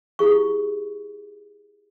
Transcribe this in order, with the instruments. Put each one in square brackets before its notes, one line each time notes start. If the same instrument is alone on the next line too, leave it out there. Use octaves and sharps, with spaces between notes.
[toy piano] E4 G4 G#4 C#6